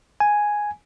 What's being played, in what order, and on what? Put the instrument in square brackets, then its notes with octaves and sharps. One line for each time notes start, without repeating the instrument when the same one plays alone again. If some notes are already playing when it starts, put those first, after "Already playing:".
[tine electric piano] G#5